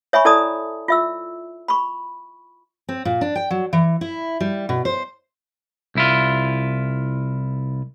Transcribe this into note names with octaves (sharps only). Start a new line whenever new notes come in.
C#5 E5 G#5 B5 C#6
E4 A4 D5 A5 A#5 D#6
F4 E5 E6
B5 C#6
C4
A#2
D4
G5
F#3
E3
E4
G3
B2
C5
C2 E4 F4